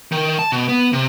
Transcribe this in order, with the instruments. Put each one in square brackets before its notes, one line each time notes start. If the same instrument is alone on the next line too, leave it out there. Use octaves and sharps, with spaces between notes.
[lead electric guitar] D#3
A5
B2
B3
C3